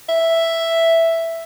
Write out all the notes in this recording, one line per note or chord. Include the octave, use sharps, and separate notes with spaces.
E5